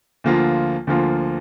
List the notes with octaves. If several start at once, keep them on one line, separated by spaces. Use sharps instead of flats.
D2 D3 F3 A#3 F4
D2 D3 F3 A#3 F4